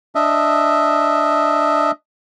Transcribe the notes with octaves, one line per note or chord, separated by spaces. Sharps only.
D4 D#5 E5